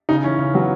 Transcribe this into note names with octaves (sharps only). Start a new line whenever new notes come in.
C#3 D#4
E3 C#4
C#3
F#3 B3